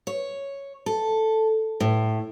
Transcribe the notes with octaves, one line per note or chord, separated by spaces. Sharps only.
C#5
A4
A2